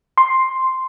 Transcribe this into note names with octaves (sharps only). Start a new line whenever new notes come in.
C6